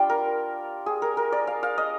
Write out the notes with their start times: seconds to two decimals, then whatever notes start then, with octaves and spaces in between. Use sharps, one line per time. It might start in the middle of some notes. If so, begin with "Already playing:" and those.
Already playing: G3 D4 F4 D5 F5 G5
0.09 A#4
0.86 G#4
1.02 A#4
1.17 A#4
1.32 D5
1.47 F5
1.63 F5
1.78 D#5